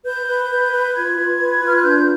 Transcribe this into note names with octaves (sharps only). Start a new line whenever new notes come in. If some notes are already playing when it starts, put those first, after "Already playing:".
B4 G6
B4
B4
B4
F4 G#6
F4
B4
F4
F6
F#6
D4 G6